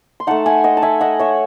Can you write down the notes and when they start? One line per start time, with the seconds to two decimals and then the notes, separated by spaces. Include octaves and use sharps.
0.20 C6
0.27 A3 D#4 F#5 A5
0.46 E5 G#5
0.64 D#5 F#5
0.77 A5
0.82 E5 G#5
1.01 D#5 F#5
1.19 C#5 E5